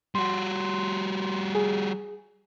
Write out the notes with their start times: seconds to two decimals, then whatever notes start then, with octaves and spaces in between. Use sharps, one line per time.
0.15 G3 F#4 C6
1.55 G#4